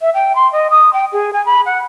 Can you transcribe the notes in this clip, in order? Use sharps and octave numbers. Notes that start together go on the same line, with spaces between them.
E5
G5
C6
D#5
D#6
G5
G#4
G#5
B5
F#5